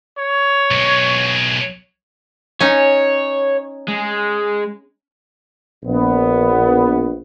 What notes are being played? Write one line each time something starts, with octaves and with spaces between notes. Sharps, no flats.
C#5
B1 G#3
C#4 D#4 C#5
G#3
A#1 B3